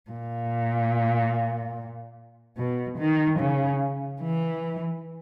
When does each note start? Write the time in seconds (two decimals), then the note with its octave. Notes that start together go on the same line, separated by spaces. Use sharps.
0.11 A#2
2.57 B2
2.98 D#3
3.39 C#3
4.22 E3